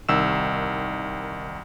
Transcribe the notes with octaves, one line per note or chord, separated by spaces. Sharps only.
C2 D#3 E6 E7